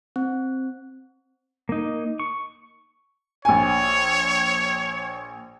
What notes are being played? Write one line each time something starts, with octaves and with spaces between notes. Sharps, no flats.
C4
A#3 D#4
C#6
A#1 C#5 G#5